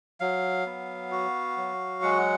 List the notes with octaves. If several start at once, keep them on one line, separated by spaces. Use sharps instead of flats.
F#3 F5
B3
F#4
F#3
G#3 F#5